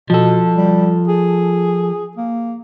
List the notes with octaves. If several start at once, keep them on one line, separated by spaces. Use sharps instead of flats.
B2 F3 A4
G3
G#4
A#3